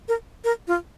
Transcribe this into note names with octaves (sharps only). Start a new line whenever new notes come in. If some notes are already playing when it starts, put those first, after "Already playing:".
A#4
A#4
F4